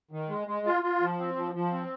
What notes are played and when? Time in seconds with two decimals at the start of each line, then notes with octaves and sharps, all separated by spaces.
0.11 D#3
0.29 G#3
0.47 G#3
0.66 F4
0.83 F4
1.00 F3
1.19 C4
1.36 F3
1.54 F3
1.72 C4